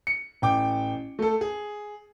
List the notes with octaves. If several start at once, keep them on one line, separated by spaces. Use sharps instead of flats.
C#7
A1 G5 D6
A3 A4
G#4